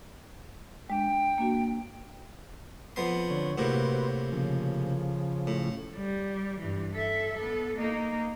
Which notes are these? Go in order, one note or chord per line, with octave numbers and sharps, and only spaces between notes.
G#3 D4 G5
A#3 D4 F#4
F2 B3 C6
D3 C#5
A2 C3 A#3 F#4 B4 C5
C#3 F3
A2
G3
G2 E3
A4 E5
B3 A4
A#3 D#4